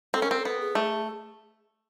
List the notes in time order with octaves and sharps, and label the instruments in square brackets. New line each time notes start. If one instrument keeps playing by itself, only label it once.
[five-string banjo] C4 [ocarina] A4
[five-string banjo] C#4
[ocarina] A#4
[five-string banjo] C4
[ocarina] A4
[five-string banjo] B3
[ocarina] G#4
[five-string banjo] A3